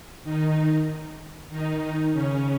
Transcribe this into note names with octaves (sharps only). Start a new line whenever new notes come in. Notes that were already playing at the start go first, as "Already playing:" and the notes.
D#3 D#4
D#3 D#4
C#3 C#4